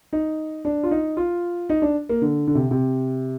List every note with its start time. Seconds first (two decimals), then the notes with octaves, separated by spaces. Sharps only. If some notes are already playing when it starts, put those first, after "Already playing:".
0.13 D#4
0.65 D4
0.83 F4
0.91 D#4
1.17 F4
1.69 D#4
1.82 D4
2.09 A#3
2.22 D3
2.48 D3
2.55 C3
2.71 C3